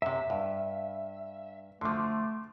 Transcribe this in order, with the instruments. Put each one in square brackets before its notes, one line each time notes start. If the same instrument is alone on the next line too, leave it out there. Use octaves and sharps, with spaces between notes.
[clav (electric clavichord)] F#2 C3 [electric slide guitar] E5
[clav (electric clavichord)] G2 [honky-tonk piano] F5
[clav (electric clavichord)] D3 F3 [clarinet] A3 [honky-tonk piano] C6 D6